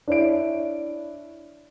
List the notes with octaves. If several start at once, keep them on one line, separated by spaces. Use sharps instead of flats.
D4 E4 C#5 E5 D7